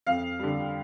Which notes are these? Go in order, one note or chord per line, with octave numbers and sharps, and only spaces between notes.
F2 F5
D3 G3